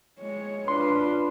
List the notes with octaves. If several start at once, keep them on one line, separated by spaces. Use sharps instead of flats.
G#3 C#5
D4 F4 B4 C6